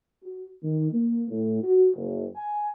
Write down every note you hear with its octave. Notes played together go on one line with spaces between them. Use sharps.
F#4
D#3
A#3
A2
F#4
F#1
G#5